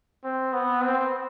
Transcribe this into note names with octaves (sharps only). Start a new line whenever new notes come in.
C4
B3
C4